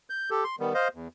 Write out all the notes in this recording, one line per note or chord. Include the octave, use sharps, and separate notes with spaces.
G6
G4 A4
C6
D#3 G3 B3
C5 D#5 F5
E2